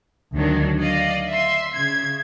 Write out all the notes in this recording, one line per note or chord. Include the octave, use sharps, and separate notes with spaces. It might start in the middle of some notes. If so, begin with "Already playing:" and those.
D2 D#3 F#3 D4
D5 D#5 F5
E5 C6
C#3 G#6